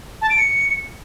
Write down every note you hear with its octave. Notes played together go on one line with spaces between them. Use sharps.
A5
D7
C#7